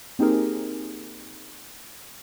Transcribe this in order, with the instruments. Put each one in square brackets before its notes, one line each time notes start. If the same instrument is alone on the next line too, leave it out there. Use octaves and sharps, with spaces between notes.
[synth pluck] A#3 C4 D#4 G4 G#4 A#4